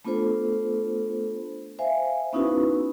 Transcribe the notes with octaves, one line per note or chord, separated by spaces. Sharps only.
A3 B3 D4 F4 A4 C5
C5 E5 F5 G#5
B3 C#4 D#4 E4 F#4 B4